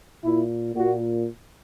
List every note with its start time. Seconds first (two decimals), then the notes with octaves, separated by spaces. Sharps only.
0.24 A#2 E4
0.75 A#2 F#4